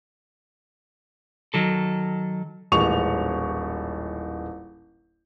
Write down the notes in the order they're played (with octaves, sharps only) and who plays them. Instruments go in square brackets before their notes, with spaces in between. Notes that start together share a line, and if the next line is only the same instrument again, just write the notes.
[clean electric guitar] D#3 F#3 A4
[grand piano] D#1 A1 G#3 C#6 F7